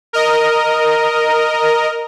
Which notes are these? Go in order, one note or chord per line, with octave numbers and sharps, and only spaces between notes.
A#4 D#5